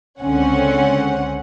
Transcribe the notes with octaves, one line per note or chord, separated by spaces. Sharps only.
C#2 D3 C4 C#4 F#5